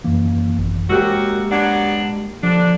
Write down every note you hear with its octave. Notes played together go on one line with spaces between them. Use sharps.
F#2 E3 A#3
G#1
F#2 G#3 A#3 F#4 G4 E6
F#3 B3 D4 F#5 G#6
D3 F3 D4